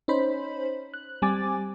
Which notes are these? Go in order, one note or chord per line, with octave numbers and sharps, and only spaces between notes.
C#4 D#4 C5 B5
F#6
G3 C4 G#5 D6 A6